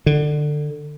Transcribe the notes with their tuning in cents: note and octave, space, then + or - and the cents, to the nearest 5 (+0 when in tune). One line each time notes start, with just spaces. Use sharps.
D3 +20